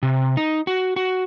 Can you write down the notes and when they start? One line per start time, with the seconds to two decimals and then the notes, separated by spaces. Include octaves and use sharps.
0.03 C3
0.37 D#4
0.67 F#4
0.96 F#4